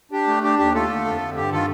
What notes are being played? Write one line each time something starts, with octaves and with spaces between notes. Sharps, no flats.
D4 G4
A3
D4 G4
D#2 G4
A3 F4 A4
D3
F2
D3
G2 G4
D#3 F4 A4